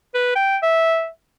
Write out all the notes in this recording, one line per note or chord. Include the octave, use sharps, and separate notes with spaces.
B4
G5
E5